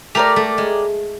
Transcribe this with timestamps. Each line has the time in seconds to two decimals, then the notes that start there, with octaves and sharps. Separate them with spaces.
0.15 A3 G4 A#4 D5
0.36 A3
0.58 G#3